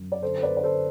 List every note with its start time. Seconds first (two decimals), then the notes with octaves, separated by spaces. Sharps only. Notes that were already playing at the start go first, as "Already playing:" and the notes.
Already playing: F#2
0.12 D5
0.22 D3 A4 C5
0.38 C5
0.43 B4 D5
0.53 D3 D5
0.63 A4 C5